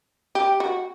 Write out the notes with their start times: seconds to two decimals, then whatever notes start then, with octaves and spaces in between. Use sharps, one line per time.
0.35 G4
0.60 F#4